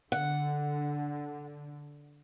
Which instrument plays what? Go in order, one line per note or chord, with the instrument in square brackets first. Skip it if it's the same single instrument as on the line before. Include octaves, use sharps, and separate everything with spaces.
[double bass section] D3 [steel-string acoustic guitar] F#5